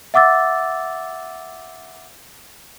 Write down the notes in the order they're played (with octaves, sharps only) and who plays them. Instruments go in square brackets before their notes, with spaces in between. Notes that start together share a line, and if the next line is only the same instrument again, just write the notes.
[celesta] E5 F#5 D6 E6 A6